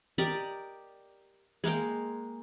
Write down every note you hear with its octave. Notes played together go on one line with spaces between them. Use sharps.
G4 A#4 D5 D#5
G#3 A#3 F5 G5